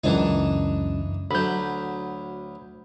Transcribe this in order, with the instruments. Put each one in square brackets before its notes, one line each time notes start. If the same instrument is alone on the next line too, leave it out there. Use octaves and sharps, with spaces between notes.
[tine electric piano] C#2 F#2 [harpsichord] E3 D4 D#4
[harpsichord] D2 F#3 [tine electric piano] B5 G6